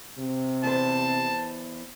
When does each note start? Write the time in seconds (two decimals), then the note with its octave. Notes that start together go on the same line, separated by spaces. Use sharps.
0.18 C3
0.63 E2 C5 A5